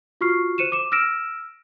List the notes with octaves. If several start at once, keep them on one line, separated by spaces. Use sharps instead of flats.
F4 F#4 C#6 F6 C7
C5 C#7 D#7 E7
D6 E7
E6 F6 A#6 D7 E7